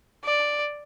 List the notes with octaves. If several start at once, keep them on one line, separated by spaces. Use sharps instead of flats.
D5